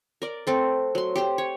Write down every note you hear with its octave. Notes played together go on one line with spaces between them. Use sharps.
A#4 D5
A3 C4 A4
F#3 C6
G4 C5 G5
C#5